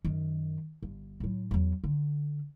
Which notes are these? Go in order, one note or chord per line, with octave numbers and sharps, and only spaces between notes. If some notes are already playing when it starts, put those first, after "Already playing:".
F#2 D#3
G1
A2 F#3
E2 F#3
D3